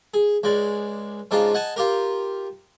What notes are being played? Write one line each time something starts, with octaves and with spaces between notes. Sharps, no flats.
G#4
C#2 G#3 D5
G#2 C#3 D4 D#4 F4
D#5 F#5 G#5 A5
F4 G4 A#4